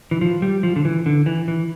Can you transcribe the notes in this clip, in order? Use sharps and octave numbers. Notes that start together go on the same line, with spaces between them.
E3
F3
G3
F3
D3
E3
D3
E3
E3